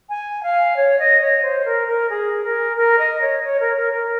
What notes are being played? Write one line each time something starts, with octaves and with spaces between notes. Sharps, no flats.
G#5
F5
C#5
D#5
C#5
C5
A#4
A#4
G#4
A#4
A#4
D#5
C#5
C#5
A#4
A#4
A#4